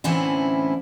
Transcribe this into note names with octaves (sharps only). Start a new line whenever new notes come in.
A2 D3 E3 C4 C#4 E4